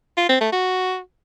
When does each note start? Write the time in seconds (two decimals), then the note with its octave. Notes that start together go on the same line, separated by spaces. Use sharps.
0.17 F4
0.29 C4
0.41 A3
0.52 F#4